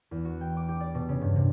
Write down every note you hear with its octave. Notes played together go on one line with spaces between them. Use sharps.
E2
F#4
G5
D6
G4
D5
B2
C#3
G2
C3